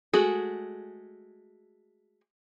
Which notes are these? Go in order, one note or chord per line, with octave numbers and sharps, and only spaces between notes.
G#3 A3 F#4 G#4